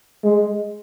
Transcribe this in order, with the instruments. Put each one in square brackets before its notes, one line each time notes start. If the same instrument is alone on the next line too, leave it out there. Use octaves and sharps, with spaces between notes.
[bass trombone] G#3